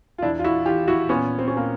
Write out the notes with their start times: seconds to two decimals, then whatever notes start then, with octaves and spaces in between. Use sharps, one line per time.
0.18 F4
0.22 E2 D4 E4
0.39 F4
0.44 E4 F#4
0.66 E3 F4 G4
0.88 E4 F#4
1.09 A#2 B3 C#4
1.39 C4
1.48 C#4
1.56 A#3 C4